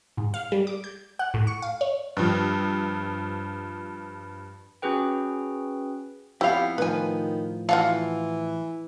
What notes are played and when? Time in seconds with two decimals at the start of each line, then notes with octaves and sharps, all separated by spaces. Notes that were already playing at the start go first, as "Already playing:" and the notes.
0.17 G#2
0.34 F5
0.52 G3
0.67 D6
0.84 G6
1.19 F#5
1.34 A2
1.47 C#6
1.62 F5
1.81 C#5
2.17 G2 F3
4.82 C#4 F#4 G#4 B4 G5
6.41 F2 B3 E4 G4 F5
6.78 A2 D#3 F3 B4 G#5
7.69 E3 F4 F#4 A4 F5 F#5